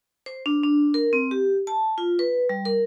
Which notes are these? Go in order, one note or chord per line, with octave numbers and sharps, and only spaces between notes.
C5
D4
D4
A#4
C4
G4
A5
F4
B4
G3
A#4